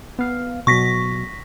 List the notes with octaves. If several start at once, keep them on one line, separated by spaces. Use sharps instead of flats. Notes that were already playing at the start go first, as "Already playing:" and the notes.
B3 F5
B2 F#3 C#6 A#6 B6